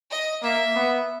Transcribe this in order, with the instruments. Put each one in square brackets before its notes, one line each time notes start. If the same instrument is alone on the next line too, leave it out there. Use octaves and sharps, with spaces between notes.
[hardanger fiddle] D#5
[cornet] A#3 [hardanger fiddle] E5
[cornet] B3